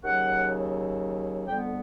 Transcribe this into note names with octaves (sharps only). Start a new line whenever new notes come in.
D#2 C#3 F#3 F#5
F2 D3 G3 B3 G5